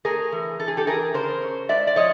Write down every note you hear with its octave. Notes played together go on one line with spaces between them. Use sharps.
A3 G#4 A#4
E3
E3 A4
G#4
G4 A4
E3 G#4 A#4
C#3 A#4 C5
C#4
G#3 D5 E5
D5
F3 C#5 D#5